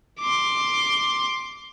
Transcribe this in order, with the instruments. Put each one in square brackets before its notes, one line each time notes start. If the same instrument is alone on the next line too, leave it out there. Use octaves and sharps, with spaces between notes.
[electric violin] C6 D6